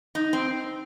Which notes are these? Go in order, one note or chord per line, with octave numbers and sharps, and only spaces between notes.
D#4
C4